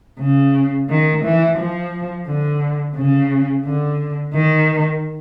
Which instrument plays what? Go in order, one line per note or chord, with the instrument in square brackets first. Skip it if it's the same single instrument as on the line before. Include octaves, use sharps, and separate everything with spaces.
[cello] C#3
D#3
E3
F3
D3
C#3
D3
D#3